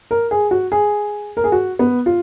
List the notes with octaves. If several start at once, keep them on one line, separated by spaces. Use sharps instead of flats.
A#4
G#4
F#4
G#4
A#4
G#4
F#4
B3
F4